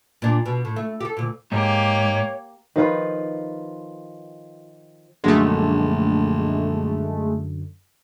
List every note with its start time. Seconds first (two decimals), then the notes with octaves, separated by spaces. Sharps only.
0.22 A#2 D4
0.46 B2
0.65 A2
0.76 A3
1.00 G4 A4
1.17 D2 A#2
1.52 G#2 A#3 G4 C#5
2.76 D#3 F3 F4 B4
5.24 A#1 F#2 D3 G#3 A3